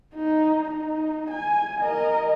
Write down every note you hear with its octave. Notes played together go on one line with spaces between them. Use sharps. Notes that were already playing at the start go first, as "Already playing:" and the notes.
D#4
D#4
G#5
A#4 D#5